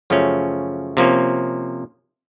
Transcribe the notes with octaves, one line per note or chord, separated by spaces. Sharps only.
F#2 C#3 F3 A3 C#4
C3 F3 A#3 C#4